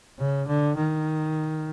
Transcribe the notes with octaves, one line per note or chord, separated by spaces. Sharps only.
C#3
D3
D#3